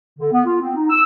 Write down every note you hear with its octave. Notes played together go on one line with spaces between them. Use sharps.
D3
B3
F4
C4
D#4
E6